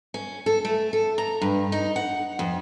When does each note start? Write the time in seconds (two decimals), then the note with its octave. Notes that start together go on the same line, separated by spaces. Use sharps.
0.14 C#4
0.46 A4
0.65 A3
0.93 A4
1.18 A#5
1.41 G2
1.72 D#4
1.96 F#5
2.39 F2